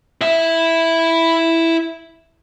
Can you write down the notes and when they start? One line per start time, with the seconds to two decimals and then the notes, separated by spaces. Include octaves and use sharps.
0.21 E4 E5